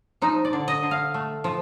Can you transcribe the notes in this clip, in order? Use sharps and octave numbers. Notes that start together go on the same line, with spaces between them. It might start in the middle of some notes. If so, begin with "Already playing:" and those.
F3 D#4
D5
D3
D#5
D3
F5
A3
F3